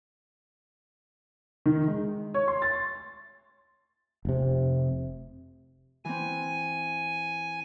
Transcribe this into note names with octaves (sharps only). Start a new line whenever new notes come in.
D#3
G#3
C#5
C6
A6
F1 C3
E3 C4 G#5